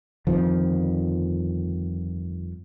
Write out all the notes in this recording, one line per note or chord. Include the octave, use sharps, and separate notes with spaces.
G1 F2 D#3 F3